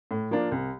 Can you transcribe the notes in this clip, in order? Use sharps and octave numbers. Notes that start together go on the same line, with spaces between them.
A2
F3 A#3 D4
C2